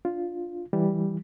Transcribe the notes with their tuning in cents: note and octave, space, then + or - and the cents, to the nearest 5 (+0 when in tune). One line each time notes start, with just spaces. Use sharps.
D4 -10 F4 +0
E3 +0 G3 +0